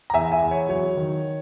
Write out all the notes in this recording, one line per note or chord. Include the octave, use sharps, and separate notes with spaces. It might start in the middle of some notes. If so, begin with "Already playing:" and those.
A#5
E2 E5 G#5
E5 G#5
E2
C#5
F#3 C#5
D#3